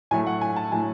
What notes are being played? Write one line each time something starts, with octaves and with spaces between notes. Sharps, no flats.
A2 F#3 A3 G#5
F#5
G#5
A5
A2 F#3 A3 G#5